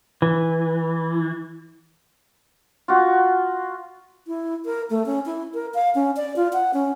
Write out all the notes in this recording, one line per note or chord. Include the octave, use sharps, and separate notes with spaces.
E3
F4 F#4
E4
A#4
A3
C#4
E4
A#4
F5
C#4
D5
F4
F#5
C#4